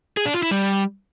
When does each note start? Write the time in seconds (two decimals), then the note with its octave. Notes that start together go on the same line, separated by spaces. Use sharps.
0.17 G#4
0.26 D4
0.34 F4
0.43 E4
0.51 G3